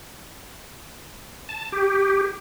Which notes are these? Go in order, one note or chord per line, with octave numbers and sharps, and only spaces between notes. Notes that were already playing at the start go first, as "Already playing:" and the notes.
A5
G4